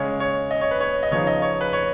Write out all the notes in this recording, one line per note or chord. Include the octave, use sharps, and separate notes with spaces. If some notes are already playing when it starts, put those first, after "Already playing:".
Already playing: C#3 G#3 C#4 C#5
C#5
D#5
C#5
B4
C#5
D#5
C#3 F3 B3 D#4 C#5
D#5
C#5
B4
C#5